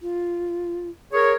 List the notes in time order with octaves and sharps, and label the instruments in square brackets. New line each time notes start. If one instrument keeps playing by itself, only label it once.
[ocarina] F4
[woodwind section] G#4 A#4 C#5